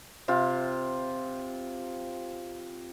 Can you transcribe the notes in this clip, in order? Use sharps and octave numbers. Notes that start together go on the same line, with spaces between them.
C3 F4